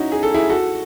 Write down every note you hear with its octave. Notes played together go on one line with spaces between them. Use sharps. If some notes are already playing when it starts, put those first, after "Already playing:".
Already playing: C#4 D#4 E4 F#4
G#4
A4
E4 G#4
F#4 A4